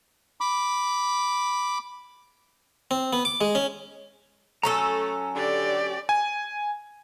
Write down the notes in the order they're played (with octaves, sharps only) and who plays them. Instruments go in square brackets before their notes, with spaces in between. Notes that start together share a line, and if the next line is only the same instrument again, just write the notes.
[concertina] B5 D6
[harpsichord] C4
B3
D6
G#3
C#4
[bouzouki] F#3 C#4 A4 [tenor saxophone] A3 [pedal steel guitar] A#5 E6
[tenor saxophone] D3 [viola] G4 D5
[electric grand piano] G#5